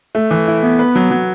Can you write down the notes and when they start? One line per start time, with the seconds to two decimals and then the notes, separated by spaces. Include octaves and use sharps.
0.15 A3
0.31 E3
0.48 E4
0.63 B3 E4
0.79 B4
0.95 F#3
1.11 F#3